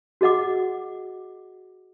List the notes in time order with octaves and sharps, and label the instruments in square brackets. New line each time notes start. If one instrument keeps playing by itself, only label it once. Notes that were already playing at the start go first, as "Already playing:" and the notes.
[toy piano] F#4 G#4 D#5 F#5 D6